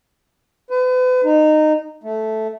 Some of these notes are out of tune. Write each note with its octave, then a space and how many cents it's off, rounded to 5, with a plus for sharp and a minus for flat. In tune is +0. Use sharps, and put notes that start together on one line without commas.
B4 +40
D#4 -20
A3 -5